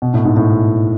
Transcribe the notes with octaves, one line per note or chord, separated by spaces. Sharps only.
B2
A2
G#2
A2